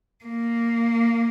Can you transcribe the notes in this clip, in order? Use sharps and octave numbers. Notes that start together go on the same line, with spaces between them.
A#3